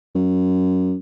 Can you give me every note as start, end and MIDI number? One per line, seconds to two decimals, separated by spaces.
0.15 0.96 42